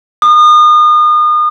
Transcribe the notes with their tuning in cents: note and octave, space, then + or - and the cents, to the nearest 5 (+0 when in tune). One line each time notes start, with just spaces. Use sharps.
D#6 -35